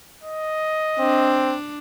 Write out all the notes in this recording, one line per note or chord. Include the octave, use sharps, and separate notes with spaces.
D#5
C4 D4